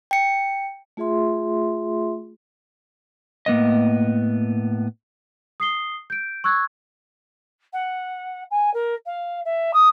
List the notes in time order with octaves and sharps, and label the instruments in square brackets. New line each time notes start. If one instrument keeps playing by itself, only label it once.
[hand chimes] G5 C#7
[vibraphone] A3 F4 G#4 E5 C6
[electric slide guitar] A2 A#3 B3 D#5
[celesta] D#6 C7 G7
G6 D7
C#6 E6 F#6 G#6
[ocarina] F#5
G#5
A#4
F5
E5
D#6